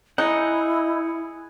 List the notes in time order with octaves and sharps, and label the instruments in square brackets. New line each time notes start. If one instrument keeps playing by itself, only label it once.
[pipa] D#4 [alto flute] E4 [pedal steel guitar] G#4 F#5